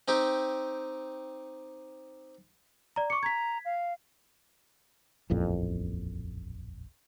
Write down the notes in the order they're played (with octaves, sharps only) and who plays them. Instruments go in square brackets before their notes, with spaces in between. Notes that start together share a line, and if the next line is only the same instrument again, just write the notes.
[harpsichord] C4 D#4 G4
[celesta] D5 A#5
[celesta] C#6 C#7 [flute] D6
[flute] A#5 [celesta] G#6 B6
[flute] F5
[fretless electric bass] D#1 A1 F2 A#2